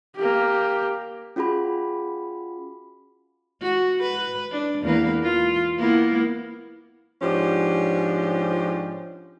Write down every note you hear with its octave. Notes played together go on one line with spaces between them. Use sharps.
A#3 G4
C#4 F4 F#4 G#4 B5
F#4
B4
D4
E2 A#3 B4
F4
A#3 B3 E4
G#2 F3 C#4 D4 G4